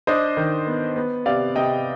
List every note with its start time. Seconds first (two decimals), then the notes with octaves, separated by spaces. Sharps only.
0.07 D4 C5 D#5
0.37 D#3
0.67 B3
0.96 B3
1.26 C3 D5 F5
1.55 C3 D#5 G5